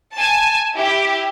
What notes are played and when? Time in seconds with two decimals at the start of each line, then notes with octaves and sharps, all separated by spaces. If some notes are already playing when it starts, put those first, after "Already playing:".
0.14 G#5 A5
0.73 E4 G4